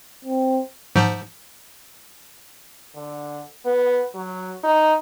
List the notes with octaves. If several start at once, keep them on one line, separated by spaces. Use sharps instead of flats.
C4
G#2 F3
D3
B3
F#3
D#4